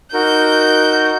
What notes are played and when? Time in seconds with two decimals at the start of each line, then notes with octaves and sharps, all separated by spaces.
0.14 D#4 F#4 A#4 G6